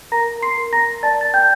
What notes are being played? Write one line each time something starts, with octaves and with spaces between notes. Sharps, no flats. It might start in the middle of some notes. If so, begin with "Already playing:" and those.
A#4 A#5 A#6
C6 C7
A#4
A#5 A#6
D5 A5 A6
A6
G5 G6